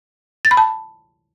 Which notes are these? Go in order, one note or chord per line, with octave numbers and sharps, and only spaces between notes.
A6
B5
A5